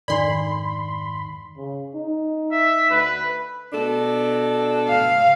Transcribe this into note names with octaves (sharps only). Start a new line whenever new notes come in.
F2 G#2 D#3 D4 A4 D5 B5 C6
C#3
D#4
E5
D2 B4
B2 D4 A4
F5